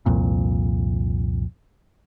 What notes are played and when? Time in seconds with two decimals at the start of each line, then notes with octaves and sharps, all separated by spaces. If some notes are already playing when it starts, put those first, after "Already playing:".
0.06 C2 F2 A#2